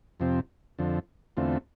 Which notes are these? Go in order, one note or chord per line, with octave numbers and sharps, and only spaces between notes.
F2 C3 F3 C4
F2 D3 F3
E2 D3 A3 C4 F4